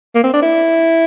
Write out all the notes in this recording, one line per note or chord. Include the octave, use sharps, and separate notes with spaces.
A#3
C4
D4
E4